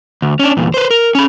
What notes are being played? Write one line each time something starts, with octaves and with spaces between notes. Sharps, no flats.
D2
C#4 D4
E2 A#2
B4 C5
A#4
C#4 B5